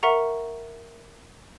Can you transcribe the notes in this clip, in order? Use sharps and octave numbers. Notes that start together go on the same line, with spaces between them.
A#4 E5 F#5 A#5 C#6